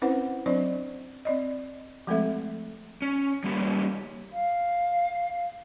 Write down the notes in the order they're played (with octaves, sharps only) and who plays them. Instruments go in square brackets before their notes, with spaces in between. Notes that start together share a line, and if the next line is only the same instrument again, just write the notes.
[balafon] C4 C#4 E4 B4 C5 F#5
F#3 C4 D4 C5 D5
C4 D5 D#5
F3 G#3 A3 C4 A4 E5
[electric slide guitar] C#4
G3 A#3 C#4 G4 B4
[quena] F5